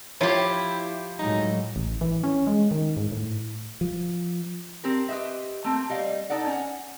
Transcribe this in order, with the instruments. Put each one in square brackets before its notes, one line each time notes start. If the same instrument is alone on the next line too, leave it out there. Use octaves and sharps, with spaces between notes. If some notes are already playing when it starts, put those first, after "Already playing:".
[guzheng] F3 G4 [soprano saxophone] E4 [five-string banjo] F4 C#5
[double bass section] A2 F#3 G#3 [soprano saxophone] D#4
[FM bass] A1
E3
C#4
G#3
D#3
G#2
A2
[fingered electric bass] F3
[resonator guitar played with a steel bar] C4 G4 A#4
G4 B4 C5 D#5 E5
A3 A#3 C4
G3 D#5 F5
D#4 A4 D5 F#5
C#4 F#5